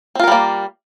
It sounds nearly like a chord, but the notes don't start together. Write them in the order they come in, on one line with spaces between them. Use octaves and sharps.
C4 F4 A#4 G3 A#3